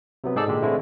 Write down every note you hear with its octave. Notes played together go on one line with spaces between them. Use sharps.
C3 F#3 B3
G#2 D#4 G#4 A4 D5 E6
A#2 D3 G#3 G4
D3 E3 G#3 A3 C4 E4